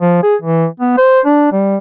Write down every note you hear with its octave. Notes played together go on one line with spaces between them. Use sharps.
F3
G#4
E3
B3
C5
D4
G3